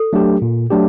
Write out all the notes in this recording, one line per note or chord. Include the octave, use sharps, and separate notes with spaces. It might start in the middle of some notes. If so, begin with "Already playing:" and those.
Already playing: A4
F#3 A3 D4 G4
A#2
F#3 A3 D4 G4